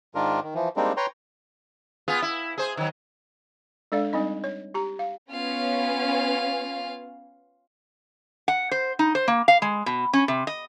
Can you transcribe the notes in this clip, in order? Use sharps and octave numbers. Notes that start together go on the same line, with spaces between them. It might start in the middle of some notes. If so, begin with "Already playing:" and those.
G#2 D#3 D4 F4 A#4
D#3
E3 F3
G3 G#3 A#3 C4 D4 D#4
B4 C#5 G5 A#5 C6
B3 F4 G#4
E4
G#4 C5
D#3 F#3
G#3 D4 A4 D5 F5
G3 C4 D#4 D#5
C#5
G4 A#5
F5
B3 C#4 F4 F5
F#5
C5
D#4
C5
A#3
F5
G#3
B2
C#4
C3
D#5